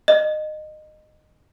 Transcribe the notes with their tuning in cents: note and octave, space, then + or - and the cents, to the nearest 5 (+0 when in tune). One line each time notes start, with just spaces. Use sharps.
D#5 -20